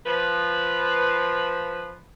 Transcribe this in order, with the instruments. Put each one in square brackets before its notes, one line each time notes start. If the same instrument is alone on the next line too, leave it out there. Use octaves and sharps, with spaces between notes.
[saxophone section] F3 B4